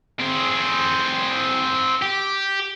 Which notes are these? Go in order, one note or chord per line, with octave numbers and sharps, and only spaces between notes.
C4 G#4
G4